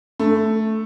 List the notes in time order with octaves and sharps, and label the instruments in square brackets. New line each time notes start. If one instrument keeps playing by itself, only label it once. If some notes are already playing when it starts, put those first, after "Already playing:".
[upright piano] A3